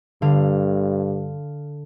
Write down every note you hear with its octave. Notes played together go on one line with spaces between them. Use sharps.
G2 D3 F5